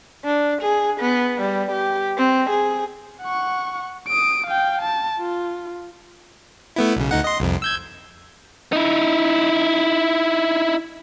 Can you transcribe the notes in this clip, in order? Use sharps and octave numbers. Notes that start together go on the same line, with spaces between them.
D4
G#4
B3
G3
G4
C4
G#4
F#5 C#6
D#6 D7
F5 G5
A5
F4
A3 B3 E4
B1 C#3
D2 D#4 F#5
D#5 C6
C2 F2
E6 G6 G#6
D#4 E4